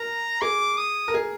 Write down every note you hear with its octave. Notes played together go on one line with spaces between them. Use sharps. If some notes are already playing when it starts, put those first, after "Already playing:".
Already playing: A#4 A#5
G#4 D6
D#6
A#4
G#4